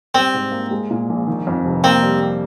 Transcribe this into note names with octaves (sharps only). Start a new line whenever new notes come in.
G3 C4
G#2
A#3
G#3
A#2
A#1
D#3
F2
F1
A#3 C4
G3